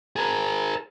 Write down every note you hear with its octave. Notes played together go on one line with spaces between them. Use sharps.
G#4 A#4